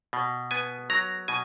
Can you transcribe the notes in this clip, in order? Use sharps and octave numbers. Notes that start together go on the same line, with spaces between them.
B2
B3 G#5
F#3 A#5
B2 G#5